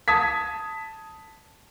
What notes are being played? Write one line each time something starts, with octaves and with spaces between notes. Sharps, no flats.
A5 D#6 G#6 B6